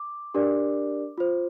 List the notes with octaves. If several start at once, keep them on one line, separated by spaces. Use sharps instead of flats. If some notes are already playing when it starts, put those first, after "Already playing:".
Already playing: D6
D4 G4 A#4 D5
F4 C5